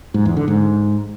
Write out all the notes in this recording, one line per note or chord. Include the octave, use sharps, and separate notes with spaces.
G#2
E2
D3
G#2